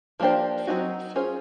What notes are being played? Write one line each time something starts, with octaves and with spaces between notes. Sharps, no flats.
F3 A#3 D4 G4 C5
F#3 A3 C4 D#4 F#4
C#4 F4 G#4 C5